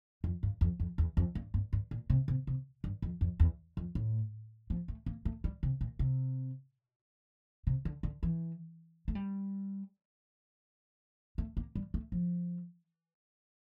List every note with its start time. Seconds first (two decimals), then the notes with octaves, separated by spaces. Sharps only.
0.24 F2
0.43 G2
0.61 F2
0.80 F2
0.98 E2
1.17 F2
1.35 G2
1.54 G2
1.73 G2
1.91 A#2
2.10 C3
2.28 C3
2.47 C3
2.84 G2
3.02 F2
3.21 F2
3.40 E2
3.77 F2
3.95 A2
4.70 F3
4.88 A3
5.06 A#3
5.25 A3
5.44 G3
5.63 C3
5.81 A#2
5.99 C3
7.67 C3
7.85 D3
8.03 D3
8.23 E3
9.08 A3
9.15 G3
11.38 A3
11.57 A#3
11.75 G3
11.94 A3
12.12 F3